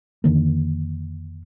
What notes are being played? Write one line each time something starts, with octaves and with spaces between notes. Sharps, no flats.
F2 D3 D#3 A#3